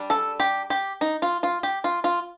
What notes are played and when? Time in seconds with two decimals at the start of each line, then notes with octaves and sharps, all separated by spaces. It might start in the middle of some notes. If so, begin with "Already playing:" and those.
Already playing: G3 D4
0.10 A4
0.40 G4
0.70 G4
1.01 D#4
1.22 F4
1.43 F4
1.63 G4
1.84 F4
2.04 F4